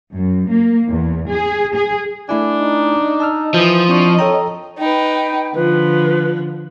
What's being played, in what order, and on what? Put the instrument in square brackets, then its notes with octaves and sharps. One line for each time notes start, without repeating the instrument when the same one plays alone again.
[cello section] F#2
A#3
E2
G#4
G#4
[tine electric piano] A3 E4 G#5 [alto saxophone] D4
[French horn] D#4
[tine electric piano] A5 E6 F6
[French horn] E3 [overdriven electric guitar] F3 [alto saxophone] D#5
[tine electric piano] C4 E4 C#6 [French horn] D4
[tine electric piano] A4 G5 A#5 [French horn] C#5
[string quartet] D#4 B4 [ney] G5
[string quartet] D3 F3 [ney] B4